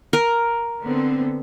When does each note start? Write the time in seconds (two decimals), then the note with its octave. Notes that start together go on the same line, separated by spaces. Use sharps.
0.13 A#4
0.83 D3 B3 C4